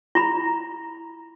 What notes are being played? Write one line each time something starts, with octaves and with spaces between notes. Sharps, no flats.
E4 A#5 B5